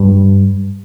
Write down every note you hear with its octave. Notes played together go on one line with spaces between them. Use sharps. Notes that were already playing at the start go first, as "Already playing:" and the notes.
Already playing: G2